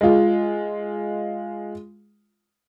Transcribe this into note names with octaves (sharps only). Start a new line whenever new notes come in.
G#3 F4